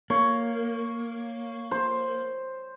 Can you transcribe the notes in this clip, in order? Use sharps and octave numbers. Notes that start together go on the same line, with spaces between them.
A#3 C#5
C5